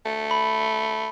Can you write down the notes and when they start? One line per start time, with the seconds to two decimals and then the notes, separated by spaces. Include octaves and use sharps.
0.06 A3
0.31 B5